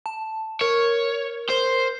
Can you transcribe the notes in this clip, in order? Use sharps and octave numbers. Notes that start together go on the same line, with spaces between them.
A5
A#4 C#5
C5